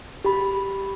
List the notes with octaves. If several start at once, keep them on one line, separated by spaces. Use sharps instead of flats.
G4 B5